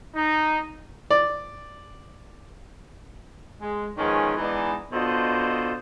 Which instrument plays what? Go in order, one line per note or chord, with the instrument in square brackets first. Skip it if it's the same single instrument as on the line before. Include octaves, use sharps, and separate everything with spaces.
[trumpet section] D#4
[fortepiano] D5
[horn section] G#3
D#3 F3 G#3 B3 C#4
E3 G#3 B3 D4 D#4
B2 D4 F4 A4 C5 D#5